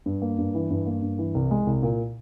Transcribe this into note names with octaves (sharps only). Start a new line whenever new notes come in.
G2
A#3
G2
E3
G2
A#3
G2
E3
C2
G#3
C2
A#2